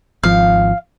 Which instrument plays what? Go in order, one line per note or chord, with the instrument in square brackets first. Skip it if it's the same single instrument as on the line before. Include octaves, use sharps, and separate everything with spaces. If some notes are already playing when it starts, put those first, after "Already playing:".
[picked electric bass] G#1 F3 [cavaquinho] F5